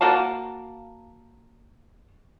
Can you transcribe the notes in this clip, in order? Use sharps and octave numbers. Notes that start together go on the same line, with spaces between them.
A#3 F#4 F5 A5